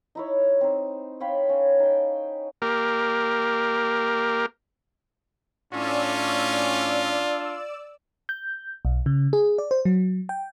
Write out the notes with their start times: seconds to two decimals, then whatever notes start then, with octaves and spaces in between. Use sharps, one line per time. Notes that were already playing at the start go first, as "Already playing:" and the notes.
0.15 D#4 E4 C#5
0.61 C4 D#4
1.20 C#5 F5 G5 B5
1.49 C#4
1.79 D#4 G5
2.62 A#3 G4 A#4
5.73 A2 C#4 D4 F4 D5 E6
8.29 G6
8.85 B1
9.06 C#3
9.33 G#4
9.58 D5
9.71 C5
9.85 F#3
10.29 G5